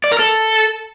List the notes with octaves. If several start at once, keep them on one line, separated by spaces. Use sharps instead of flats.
D5
A#4
A4